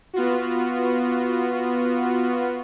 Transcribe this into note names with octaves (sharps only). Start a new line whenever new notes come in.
B3 F4 F#4